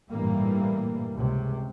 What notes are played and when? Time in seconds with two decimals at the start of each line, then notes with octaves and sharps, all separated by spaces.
0.11 A1 G2 A#2 E3 G3 A#3
1.15 C#2 C3